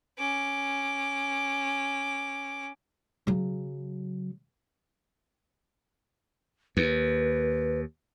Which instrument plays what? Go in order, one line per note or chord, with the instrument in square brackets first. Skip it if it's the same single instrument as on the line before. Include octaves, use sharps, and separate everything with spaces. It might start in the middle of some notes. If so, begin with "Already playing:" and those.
[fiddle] C#4 D6
[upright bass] C#3 F#3
[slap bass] D#2 [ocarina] B4